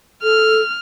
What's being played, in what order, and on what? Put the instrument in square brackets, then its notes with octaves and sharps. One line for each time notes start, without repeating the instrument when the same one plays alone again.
[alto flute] A4 [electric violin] F6